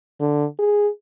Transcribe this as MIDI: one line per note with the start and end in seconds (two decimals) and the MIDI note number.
0.20 0.45 50
0.59 0.88 68